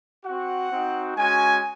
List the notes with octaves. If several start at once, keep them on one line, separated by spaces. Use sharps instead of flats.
C4 F#4 F#5
C4 D#4 F#4
G#3 C#4 F#4 G#5